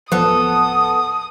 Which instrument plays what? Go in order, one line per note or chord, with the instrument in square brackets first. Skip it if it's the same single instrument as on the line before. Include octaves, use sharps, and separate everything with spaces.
[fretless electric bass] D1 F3 [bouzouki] B3 A4 [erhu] D#6